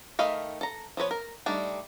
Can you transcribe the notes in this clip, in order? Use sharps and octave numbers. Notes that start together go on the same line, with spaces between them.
D#3 A3 D#5 F5 B5
A4 A#5
F3 B3 B4 C#5
A#4
G3 A3 D4 D#4